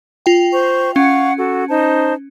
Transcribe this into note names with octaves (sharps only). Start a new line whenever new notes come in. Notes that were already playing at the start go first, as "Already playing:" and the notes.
F4 G5
C5 C#6
C#4 F5 F#5 C#6
F#4 A4
D#4 C5 A5